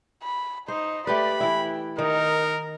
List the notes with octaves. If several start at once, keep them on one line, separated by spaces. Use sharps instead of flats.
B5
D#4 C5
A3 G4 B4 D5 B5
E3 E4 G5
D#3 D#4 A#4